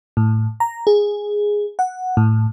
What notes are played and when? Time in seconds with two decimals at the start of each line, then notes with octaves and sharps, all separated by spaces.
0.17 A2
0.60 A#5
0.87 G#4
1.79 F#5
2.17 A2